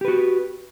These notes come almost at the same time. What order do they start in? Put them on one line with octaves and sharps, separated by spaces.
G4 B4 F#4